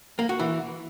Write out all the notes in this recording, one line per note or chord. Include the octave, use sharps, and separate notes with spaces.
A#3
F#4
E3